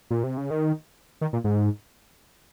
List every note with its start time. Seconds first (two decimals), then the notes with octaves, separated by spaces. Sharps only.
0.11 A#2
0.24 C3
0.37 C#3
0.51 D#3
1.21 D#3
1.33 A#2
1.44 G#2